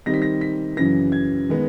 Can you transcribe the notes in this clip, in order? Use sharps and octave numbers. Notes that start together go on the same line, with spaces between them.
D#3 G3 C4 D#4 A#6
B6
A#6
B6
F#2 C#3 E3 A#6
G#6
D#3 G#3 B3